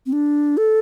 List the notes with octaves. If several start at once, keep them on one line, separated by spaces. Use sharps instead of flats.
C4
D4
A4